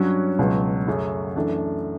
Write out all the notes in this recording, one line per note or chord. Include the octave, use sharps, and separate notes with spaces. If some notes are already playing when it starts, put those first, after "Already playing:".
Already playing: G2 F#3 C#4 F#4
C#2 B2 F#3
F#2 C#3 F#3 A3
F#2 E3 A3 D4